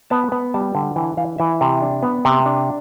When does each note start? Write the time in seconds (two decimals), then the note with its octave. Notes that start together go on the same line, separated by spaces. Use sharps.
0.10 B3 A5
0.32 B3
0.54 G3 A5
0.75 D3 G5
0.96 E3 G5
1.17 E3 F5
1.38 E3 E5
1.61 C3
1.82 D4
2.03 B3
2.25 C3
2.46 D4